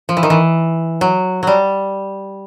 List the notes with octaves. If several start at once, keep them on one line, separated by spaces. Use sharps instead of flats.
F3
E3
D#3
E3
F#3
F#3 G3